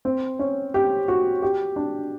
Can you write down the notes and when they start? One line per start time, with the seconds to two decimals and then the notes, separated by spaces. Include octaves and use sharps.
0.05 C4
0.39 C#4
0.74 G4
1.08 F#4
1.42 G4
1.76 D4